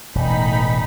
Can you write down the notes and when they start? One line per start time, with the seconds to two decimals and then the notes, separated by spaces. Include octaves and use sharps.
0.15 E1 A1 D#4 B5